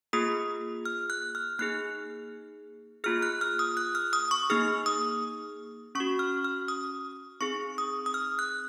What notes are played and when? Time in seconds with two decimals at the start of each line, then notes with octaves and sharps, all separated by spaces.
0.13 A#3 F4 G#4 D#6
0.85 F6
1.10 F#6
1.35 F6
1.59 A#3 D#4 G#4 F#6
3.04 A#3 F4 G#4 F6
3.22 F#6
3.41 F6
3.59 D#6
3.77 F#6
3.95 F6
4.13 D#6
4.31 C#6
4.50 A#3 D#4 G#4 F6
4.86 D#6
5.95 C#4 C#6
6.00 F#4
6.19 F6
6.44 F6
6.68 D#6
7.41 C4 D#4 G#4 C#6
7.78 D#6
8.06 D#6
8.14 F6
8.39 F#6